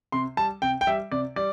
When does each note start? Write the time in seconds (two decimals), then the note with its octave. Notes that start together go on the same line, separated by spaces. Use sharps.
0.12 C3 C6
0.37 G3 A5
0.62 C3 G5
0.81 G5
0.87 G3 E5
1.12 C3 D5
1.36 G3 D5